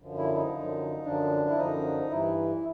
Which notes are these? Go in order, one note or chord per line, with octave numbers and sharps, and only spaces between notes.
F#2 D3 F3
E4
D#4
F#2 D3 F3
F#2 D3 F3 D4
E4
F#2 D3 F3 D#4
G2 E3 E4